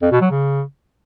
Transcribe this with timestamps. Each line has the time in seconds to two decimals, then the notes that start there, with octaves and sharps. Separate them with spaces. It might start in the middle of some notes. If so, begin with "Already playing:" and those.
0.02 F2
0.12 B2
0.21 F#3
0.31 C#3